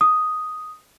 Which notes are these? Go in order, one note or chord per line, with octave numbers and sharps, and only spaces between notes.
D#6